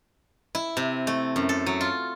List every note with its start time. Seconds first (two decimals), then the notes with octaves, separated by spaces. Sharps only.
0.55 E4
0.77 C3
1.07 A3
1.36 F#2
1.49 A4
1.66 F#3
1.81 F4